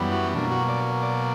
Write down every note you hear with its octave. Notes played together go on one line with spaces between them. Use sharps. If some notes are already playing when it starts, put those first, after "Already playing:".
Already playing: F#2 E3 G3 B3
F#4
B2 F#3 A#3 D4
F#4
D5
D5